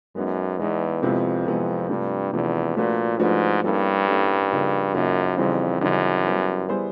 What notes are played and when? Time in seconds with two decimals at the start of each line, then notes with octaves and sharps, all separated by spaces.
0.15 F#2 G#3 B3 D#4
0.59 E2 G#3 B3 D#4
1.02 F2 C3 F3 G#3 B3 E4
1.47 C3 F3 G#3 B3 E4
1.89 G2 C3 F3 A3 D4
2.33 E2 C3 F3 A3 D4
2.76 A#2 F3 A3 D4 F#4 B4
3.20 G#2 F3 A3 D4 F#4 B4
3.64 G2 G3 A#3 C#4 E4 A4
4.08 G3 A#3 C#4 E4 A4
4.51 C#3 F3 A#3 D#4
4.94 F#2 C#3 F3 A#3 D#4
5.37 F2 C#3 E3 G3 C4 D#4
5.81 F#2 C#3 E3 G3 C4 D#4
6.25 G3 B3 E4 G#4 C5
6.69 G3 B3 E4 G#4 C5